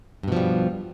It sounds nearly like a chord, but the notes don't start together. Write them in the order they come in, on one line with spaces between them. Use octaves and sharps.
G2 B2 F3 G3